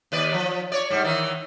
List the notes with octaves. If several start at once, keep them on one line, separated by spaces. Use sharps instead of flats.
D#2 B4 D5
F3
C#5 D5
G#2 G3
D#3 E3